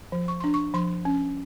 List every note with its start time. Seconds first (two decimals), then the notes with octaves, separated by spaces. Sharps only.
0.12 F3
0.28 C#6
0.40 D4 C6
0.54 C#6
0.74 F3 C6
1.05 C#4